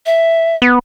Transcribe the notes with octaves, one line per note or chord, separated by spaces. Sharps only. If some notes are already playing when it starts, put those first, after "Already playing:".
E5
B3